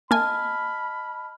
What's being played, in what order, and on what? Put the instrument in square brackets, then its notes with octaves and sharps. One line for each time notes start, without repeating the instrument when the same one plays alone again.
[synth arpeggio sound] A#3 G#5 [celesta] D#5 A5 F6 [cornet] B5